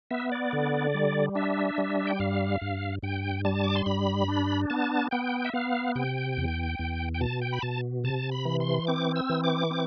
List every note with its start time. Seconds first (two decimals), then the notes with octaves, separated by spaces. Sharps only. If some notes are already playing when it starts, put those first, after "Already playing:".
0.11 B3 E5
0.32 D5
0.53 D3
0.94 G3
1.35 D4 E5
1.78 G3
2.07 G5
2.19 G2 F5
2.61 G2
3.03 G2 G5
3.45 G3 A5
3.64 D6
3.76 C6
3.86 G2 B5
4.28 D4
4.70 B3 A5
5.11 B3 G5
5.45 E5
5.54 B3 F5
5.95 C3 G5
6.37 E2
6.79 E2
7.14 G5
7.21 B2 A5
7.42 G5
7.52 B5
7.62 B2 A5
8.04 C3 A5
8.31 B5
8.45 E3
8.60 C6
8.87 C4 D6
9.16 E6
9.30 E3
9.44 D6
9.71 C4